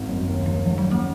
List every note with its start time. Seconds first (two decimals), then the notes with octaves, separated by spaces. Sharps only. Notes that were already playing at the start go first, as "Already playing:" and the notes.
Already playing: G#1
0.09 F#2
0.28 D#2
0.46 D#2 F3
0.65 G#2 F3
0.78 F#3
0.85 C#4
0.91 A#3